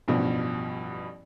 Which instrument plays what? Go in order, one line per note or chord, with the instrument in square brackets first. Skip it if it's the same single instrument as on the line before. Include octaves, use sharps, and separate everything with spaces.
[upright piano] A1 G2 B2 F3 G3